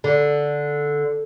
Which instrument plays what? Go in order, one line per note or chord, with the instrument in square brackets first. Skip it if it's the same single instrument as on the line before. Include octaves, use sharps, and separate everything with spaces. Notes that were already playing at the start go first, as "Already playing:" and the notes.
[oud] D3